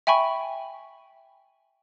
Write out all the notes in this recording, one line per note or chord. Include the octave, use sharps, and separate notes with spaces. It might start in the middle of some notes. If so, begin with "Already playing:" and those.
E5 G5 G#5 B5 C#6